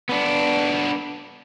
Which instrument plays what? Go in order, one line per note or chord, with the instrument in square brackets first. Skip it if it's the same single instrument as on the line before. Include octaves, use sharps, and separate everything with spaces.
[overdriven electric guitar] B3 D4